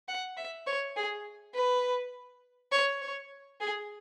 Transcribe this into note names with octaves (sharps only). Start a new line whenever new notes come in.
F#5
E5
C#5
G#4
B4
C#5
C#5
G#4